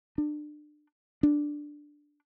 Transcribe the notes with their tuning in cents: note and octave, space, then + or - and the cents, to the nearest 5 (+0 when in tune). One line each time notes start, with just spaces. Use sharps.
D4 +30
D4 +5